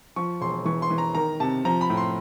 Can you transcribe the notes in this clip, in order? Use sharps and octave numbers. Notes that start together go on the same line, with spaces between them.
F3 C#6
E1 C6
E3 C#6
C6
E3
A#5
D#3 A#5
C3 A5
F3 A#5
B5
A2
C6